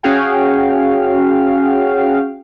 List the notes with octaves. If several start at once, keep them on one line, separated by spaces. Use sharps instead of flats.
C#4 F#4 G#4 F5 G5